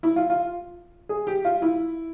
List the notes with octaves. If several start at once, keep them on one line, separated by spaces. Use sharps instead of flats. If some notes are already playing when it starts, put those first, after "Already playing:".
E4
F4
F4
G#4
G4
F4
E4